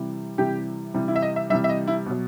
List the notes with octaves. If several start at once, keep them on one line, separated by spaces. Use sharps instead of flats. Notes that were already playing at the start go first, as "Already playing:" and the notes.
Already playing: C3 E3 G3
C3 E3 G3 G4
C3 E3 G3
E4
E5
D#5
E5
C3 E3 G3 E5
E5
D#5
E4
B2 F#3